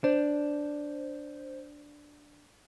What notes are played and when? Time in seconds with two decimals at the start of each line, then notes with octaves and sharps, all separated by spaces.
0.04 D4 C5